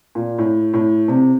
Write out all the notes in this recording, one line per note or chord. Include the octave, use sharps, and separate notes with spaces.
A#2
A2
A2
C3